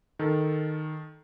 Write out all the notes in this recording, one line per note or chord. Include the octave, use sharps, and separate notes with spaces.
D#3 A4